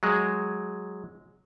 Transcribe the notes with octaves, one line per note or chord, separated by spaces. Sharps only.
F#3 G#3